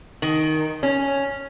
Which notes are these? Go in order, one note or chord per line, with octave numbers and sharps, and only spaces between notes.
D#3
C#4